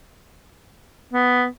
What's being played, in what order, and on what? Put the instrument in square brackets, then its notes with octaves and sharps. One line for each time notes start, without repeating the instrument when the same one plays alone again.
[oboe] B3